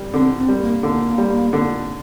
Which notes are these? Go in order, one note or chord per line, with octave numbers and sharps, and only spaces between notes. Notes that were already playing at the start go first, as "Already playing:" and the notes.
Already playing: G3
D3 C4
C4
G3
A#3
D3
G3
D3